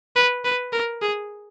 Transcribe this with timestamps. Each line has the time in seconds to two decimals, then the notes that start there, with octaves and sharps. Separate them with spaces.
0.16 B4
0.45 B4
0.73 A#4
1.02 G#4